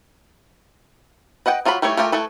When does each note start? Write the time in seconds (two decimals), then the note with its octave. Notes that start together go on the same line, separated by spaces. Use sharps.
1.46 B4 D#5 F#5 G5
1.65 F#3 F4 F#4 A#4 B5
1.82 G3 A3 D#4 E4 C#5
1.97 A3 F4 G4 A4 A#4
2.12 A3 E4 A4 B4